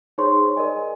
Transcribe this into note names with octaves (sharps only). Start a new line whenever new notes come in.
D#4 G#4 C5 C#5 C6 C#6
A#4 D5 D#5 G#5